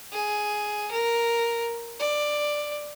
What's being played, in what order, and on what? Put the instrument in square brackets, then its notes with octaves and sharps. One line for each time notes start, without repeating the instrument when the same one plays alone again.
[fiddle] G#4
A#4
D5